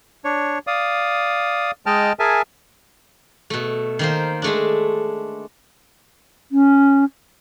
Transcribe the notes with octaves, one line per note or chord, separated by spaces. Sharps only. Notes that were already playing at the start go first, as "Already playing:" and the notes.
D4 C#5
D5 F5 D#6
G#3 D#5 G5 A5 F6
G#4 A#4 E5 G#5 A5
B2 A3
D#3 A#3 C5
G#3 A3 D4
C#4